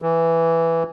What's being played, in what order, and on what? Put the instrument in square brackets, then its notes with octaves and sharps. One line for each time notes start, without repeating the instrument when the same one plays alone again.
[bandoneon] E3